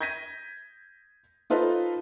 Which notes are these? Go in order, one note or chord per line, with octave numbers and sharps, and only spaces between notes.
G6 G#6 A#6 B6 D#7
D#4 F4 A4 B4 C5 D#5